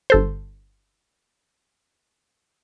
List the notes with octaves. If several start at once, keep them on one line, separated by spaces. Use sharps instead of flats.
G1 A4 C5